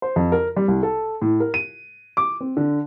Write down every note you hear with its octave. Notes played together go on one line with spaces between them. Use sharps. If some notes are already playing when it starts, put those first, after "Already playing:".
C5
F2
A#4
G3
C2
A4
A2
A#4
D#7
D6
C4
D3